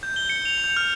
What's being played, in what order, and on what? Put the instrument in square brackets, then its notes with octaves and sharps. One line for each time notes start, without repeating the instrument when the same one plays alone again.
[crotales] G6
G7
C#7
F7
G6
F6